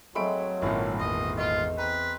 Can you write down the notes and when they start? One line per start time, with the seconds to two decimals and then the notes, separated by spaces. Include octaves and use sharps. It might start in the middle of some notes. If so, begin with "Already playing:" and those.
0.15 F#3 G#3 A3 C4 B5 D7
0.62 G#1 A#2 C#4 E4 A5
0.99 E2 C5 D#5
1.37 F4 C5 C#5 D#5
1.78 C4 B4 A#5